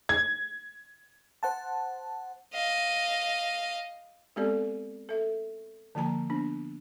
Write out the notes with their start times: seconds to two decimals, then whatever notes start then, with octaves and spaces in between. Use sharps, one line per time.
0.09 G#6
1.43 C5 F#5 A5
2.54 D#5 F5
4.36 G#3 B3 C4 G4 A4 D5
5.09 A4 E5
5.95 D3 F3 A#3 A5 A#5
6.30 B3 D4